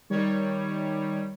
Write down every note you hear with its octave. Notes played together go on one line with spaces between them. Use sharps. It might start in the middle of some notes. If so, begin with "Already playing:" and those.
D#3 G3 C#5